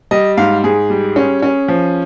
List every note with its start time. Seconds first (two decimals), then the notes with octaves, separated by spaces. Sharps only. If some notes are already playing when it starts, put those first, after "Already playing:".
0.11 G3 D#5
0.37 G#2 F5
0.64 G#2 G#4
0.90 G3
1.16 C#4
1.43 C#4
1.68 F3